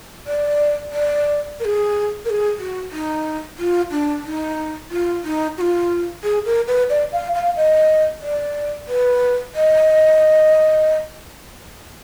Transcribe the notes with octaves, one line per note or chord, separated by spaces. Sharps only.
D5
D5
A#4
G#4
A#4
G#4
F#4
D#4
F4
D4
D#4
F4
D#4
F#4
F4
G#4
A#4
B4
D5
F5
F5
D#5
D5
B4
D#5